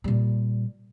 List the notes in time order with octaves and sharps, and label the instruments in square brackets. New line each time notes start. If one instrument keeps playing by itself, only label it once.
[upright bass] A#2 G3